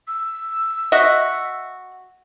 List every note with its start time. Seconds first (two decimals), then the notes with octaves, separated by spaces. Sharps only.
0.08 E6
0.92 F#4 D#5 E5 B6